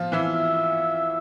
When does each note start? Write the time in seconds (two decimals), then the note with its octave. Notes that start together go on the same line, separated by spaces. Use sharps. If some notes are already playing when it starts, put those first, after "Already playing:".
Already playing: F3 F4
0.12 E3 E4 E5